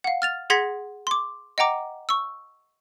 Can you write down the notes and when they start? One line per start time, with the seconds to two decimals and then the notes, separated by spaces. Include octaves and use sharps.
0.04 F5 F#5
0.22 F6 A6 F7
0.50 G#4 F#5 C6 G#6 A#6 B6
1.07 C6 D6
1.58 D#5 F#5 G5 A#5 D6
2.09 C#6 E6